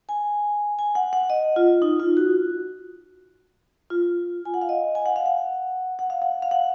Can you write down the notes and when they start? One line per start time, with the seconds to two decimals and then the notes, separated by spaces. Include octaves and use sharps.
0.09 G#5
0.79 G#5
0.95 F#5
1.13 F#5
1.30 D#5
1.56 F4
1.82 D#4
2.00 F4
2.17 F#4
3.90 F4
4.45 G#5
4.54 F#5
4.61 F5
4.69 D#5
4.95 G#5
5.06 F#5
5.16 F5
5.26 F#5
5.99 F#5
6.10 F5
6.22 F#5
6.42 F5
6.51 F#5